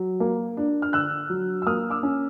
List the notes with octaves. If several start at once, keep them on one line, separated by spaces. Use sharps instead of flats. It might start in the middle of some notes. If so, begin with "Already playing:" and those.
Already playing: F#3
A#3
D4
F6
D3 E6 F#6
F#3
E6
A#3 D#6 F6
D6 E6
C#4